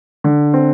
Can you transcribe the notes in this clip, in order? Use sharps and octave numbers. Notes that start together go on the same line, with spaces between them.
D3
C4